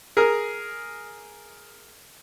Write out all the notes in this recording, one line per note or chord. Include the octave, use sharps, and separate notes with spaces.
G#4 A#4